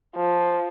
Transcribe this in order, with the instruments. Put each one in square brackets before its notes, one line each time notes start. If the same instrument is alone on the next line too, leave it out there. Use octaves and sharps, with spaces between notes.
[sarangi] F3